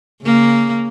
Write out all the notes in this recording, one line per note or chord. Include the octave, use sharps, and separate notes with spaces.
C#3 A#3